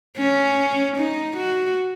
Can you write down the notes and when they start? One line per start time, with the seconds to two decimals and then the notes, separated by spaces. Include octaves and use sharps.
0.17 C#4
0.97 D#4
1.37 F#4